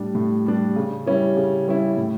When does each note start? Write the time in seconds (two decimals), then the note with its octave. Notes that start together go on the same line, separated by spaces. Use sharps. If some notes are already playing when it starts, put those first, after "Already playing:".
Already playing: A2 G3 D4
0.15 A2
0.46 G3 D4
0.76 C#3
1.06 G3 C#4 E4
1.37 C#3
1.67 G3 C#4 E4
1.97 A2